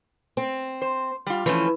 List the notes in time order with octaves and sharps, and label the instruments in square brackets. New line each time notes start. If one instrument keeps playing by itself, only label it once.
[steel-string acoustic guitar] C4
[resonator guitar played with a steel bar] C5
G3 F4
[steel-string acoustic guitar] E3 [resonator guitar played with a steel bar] F3 A3 C#4